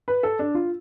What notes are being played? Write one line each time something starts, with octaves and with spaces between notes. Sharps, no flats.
B4
A4
D4
F4